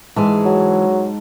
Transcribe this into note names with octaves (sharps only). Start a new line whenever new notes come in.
G#2 E3 G#3 G#4 A5
F#3